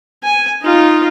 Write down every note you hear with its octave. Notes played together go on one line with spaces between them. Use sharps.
G#5
D#4 F4